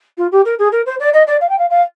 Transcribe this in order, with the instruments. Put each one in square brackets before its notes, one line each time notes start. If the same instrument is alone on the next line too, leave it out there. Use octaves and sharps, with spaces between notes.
[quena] F4
G4
A#4
G#4
A#4
C5
D5
D#5
D5
F5
G5
F5
F5